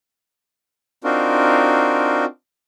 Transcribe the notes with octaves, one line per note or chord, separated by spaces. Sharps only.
C4 D4 D#4 F4 F#4 A#4